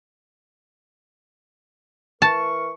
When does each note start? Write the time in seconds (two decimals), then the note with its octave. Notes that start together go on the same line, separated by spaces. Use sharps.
2.22 E3 A#4 A5 C#6